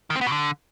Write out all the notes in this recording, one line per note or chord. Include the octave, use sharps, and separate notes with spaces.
D#3
C4
B3
B2
D3